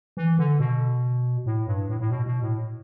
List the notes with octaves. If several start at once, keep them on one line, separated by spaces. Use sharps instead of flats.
E3
D3
B2
A2
G2
A2
A2
B2
B2
A2